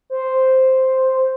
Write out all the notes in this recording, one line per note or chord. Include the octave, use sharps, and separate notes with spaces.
C5